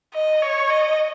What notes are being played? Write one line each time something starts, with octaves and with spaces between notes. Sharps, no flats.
D#5
C#5
D#5